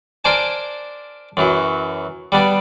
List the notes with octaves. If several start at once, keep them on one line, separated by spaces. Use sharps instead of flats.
D4 A#4 C5 D5 G#5 A5
F#2 E3 F#3
G3 B3 D4